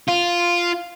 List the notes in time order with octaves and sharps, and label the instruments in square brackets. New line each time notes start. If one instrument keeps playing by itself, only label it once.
[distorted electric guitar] F4